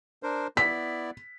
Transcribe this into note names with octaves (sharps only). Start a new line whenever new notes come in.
D4 A#4 C5
B3 E4 D5 B6